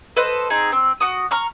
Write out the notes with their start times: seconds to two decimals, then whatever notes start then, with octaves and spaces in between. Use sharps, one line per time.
0.16 A4 B4 C5 D#5
0.50 C4 D#4 G#4
0.72 C4
1.00 F#4 D#6
1.31 A#5 C#6 F6